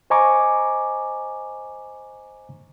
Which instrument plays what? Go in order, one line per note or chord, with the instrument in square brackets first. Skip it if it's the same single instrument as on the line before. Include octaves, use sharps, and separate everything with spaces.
[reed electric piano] C5 D#5 G#5 A#5 C#6 D6